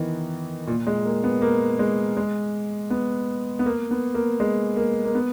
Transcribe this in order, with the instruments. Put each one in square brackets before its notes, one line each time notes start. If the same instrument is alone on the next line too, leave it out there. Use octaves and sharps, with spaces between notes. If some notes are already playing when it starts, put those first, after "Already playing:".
Already playing: [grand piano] D#3 E3 B3
A#2
G#3
A#3
B3
A#3
G#3
G#3
B3
B3
A#3
B3
A#3
G#3
A#3
A#3
B3